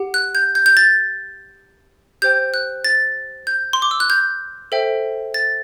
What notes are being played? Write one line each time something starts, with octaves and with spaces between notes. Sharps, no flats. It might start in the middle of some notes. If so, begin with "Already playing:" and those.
Already playing: G4 F#5
F#6
G6
G6
G6
A6
G4 C5 G5 G6
F#6
A6
G6
C6
D6
E6
F#6
G6
A4 C5 E5 G5
A6